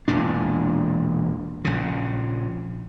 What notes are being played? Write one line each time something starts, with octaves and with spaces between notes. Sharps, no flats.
E1 E2 A#2 D4
A#1 C#3